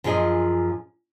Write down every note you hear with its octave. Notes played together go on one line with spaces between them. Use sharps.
F#2 F3 F4 G#4 D#5